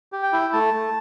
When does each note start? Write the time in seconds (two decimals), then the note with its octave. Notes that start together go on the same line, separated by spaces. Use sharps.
0.12 G4
0.23 G5
0.33 E4
0.53 A3 A5
0.74 A3